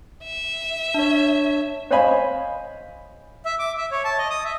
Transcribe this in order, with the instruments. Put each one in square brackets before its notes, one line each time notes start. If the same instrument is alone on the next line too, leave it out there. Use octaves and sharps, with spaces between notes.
[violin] E5
[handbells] D4 C#5
[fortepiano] C5 C#5 D#5 F5 G#5 B5
[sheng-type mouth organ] E5
D6
E5
C#5
A5
D#5
D#6
E5